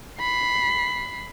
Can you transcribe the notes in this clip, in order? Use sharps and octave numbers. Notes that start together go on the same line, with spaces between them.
B5 C7